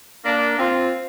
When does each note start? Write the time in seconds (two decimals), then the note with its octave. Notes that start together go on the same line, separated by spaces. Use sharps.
0.24 A#3 D4
0.59 C4 F4